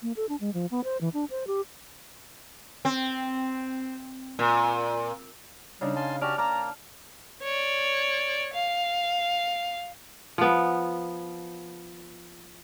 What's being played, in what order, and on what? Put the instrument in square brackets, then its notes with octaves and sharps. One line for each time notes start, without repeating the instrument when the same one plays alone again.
[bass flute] A#3
A4
D4
G#3
F3
B3
C5
E3
D4
C5
G4
[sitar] C4
A#2
[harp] C#3 D4 D#4 [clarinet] G3
[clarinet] F5 [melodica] G#5 A5 C6
[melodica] C#4 F#4 G4 [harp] D5 A5 [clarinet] F6
[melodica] A#3 [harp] A5 D6 F6 [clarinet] A#5
[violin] C#5 D5
F5
[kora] F3 B3